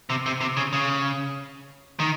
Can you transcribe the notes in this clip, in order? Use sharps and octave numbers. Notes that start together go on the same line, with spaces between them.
C3
C3
C3
C#3
C#3
D#3